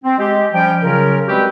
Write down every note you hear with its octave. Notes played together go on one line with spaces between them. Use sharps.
C4
G#3 G4
F3 G3 C#4 G5
C#3 F#3 C#4 F4 A#4
G3 G#3 C4 F#4 G4 B4